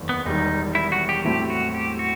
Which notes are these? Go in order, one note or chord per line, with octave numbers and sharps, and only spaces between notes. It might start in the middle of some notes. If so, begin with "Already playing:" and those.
Already playing: F#1 E2 D#3
B3
E1 E2 D#3 G3 D#4
E4
F#4
G4
A2 F#3 A3 C4 E4 G4
F#4
G4
F#4